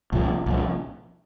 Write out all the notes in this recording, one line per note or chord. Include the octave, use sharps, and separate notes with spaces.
C2 A#2 F3
C2 A#2 F3